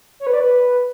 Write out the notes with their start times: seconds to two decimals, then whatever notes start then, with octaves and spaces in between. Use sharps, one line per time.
0.20 C#5
0.27 B4
0.33 D5
0.40 B4